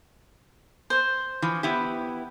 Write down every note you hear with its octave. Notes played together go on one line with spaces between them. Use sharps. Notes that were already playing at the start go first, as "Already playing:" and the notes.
C5
E3 F3
B3 E4 G4